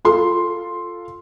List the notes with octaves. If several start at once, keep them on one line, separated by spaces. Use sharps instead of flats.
F4 A4 C6